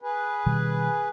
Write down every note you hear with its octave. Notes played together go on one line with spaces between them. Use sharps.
G#4 B4
B2 D#3 G3